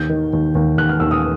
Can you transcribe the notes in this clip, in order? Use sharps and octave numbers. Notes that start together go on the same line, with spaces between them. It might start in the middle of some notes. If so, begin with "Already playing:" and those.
Already playing: D#2 G6
D#3
D#2
D#2
D#2 F#6
F6
D#2 E6
D#6